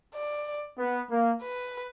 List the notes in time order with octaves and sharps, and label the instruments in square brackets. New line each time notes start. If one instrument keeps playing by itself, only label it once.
[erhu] D5
[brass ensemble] B3
A#3
[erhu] B4